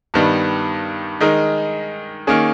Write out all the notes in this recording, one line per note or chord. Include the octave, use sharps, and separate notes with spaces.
G2 D#3 G3 B3
D#3 G#3 D#4 A#4
D#3 A#3 C#4 G#4